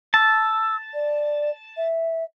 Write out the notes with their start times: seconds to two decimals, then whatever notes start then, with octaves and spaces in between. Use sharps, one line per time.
0.14 A5 E6
0.94 D5
1.77 E5